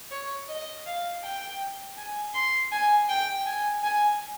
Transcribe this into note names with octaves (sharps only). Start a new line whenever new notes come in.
C#5
D#5
F5
G5
G#5
C6
G#5
G5
G#5
G#5